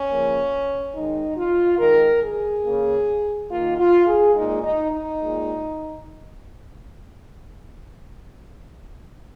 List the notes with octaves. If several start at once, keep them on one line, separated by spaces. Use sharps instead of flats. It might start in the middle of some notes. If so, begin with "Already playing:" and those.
Already playing: C#4
C#3 F3 A#3
D#3 G#3 D#4
F4
D#3 G#3 A#4
G#4
C#3 A#3
D#3 A#3 F4
F4
G#4
A#2 G#3 D#4
D#4
D#4
A#2 G#3